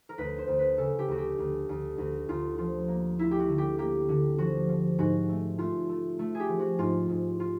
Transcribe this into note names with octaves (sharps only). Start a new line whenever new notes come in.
A#4
D2 B4
C5
D2
B4
C#3 A4
G4
D2 F#4
G4
D2
D2
D2 F#4
D2 F4
F3 F4
A#3
A#3 E4
G4
F#4
D3
G4
A#3 G4
D3
F3 F#4
F3
G#2 F#4
A3
A3 F4
A3
A3
G#4
G4
F3
F#4
G#2 F4
G#2
F4